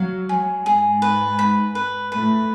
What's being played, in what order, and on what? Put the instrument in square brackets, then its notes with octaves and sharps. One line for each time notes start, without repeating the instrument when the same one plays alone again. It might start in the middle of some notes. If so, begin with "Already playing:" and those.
Already playing: [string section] F#3 [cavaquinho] F5
[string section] F#3 [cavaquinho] G#4
[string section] G#2 G#3 [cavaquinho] G#4
[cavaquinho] B4
B5
B4
[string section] A2 A3 [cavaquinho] B4